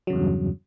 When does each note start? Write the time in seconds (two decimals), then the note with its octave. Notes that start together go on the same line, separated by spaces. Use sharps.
0.07 F#3
0.10 C#3
0.13 E2
0.15 G2